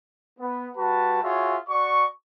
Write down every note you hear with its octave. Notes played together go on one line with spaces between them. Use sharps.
B3
G3 F#4 B4 A5
F4 F#4 G#4 C#5 E5
F#4 D5 C#6